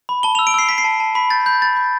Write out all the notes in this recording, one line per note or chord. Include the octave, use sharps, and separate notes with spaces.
B5
A5 G7
F7
E6
D7
E6 C7
A5 B6
C7
A5
A5
B5 B6
G6 A6
B5 G6
B5 A6
B5